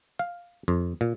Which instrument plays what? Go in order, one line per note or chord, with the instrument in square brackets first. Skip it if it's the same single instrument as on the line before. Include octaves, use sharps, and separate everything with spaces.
[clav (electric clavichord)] F5
F2
A#2